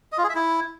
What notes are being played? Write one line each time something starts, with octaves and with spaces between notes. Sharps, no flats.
D#5
F4
G#4
E5
E4